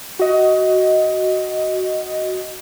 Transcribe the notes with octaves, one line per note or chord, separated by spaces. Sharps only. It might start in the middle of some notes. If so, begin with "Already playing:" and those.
F#4 D#5